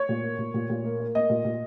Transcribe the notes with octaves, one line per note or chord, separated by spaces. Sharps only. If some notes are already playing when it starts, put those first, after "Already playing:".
Already playing: C#5
A#2
A#3
A#2
A#2
A#2
A#3
A#3
A#3 D#5
A#2
A#2